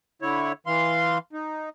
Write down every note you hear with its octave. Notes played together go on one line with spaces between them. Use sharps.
D3 E4 C#5
E3 F5 C6
D#4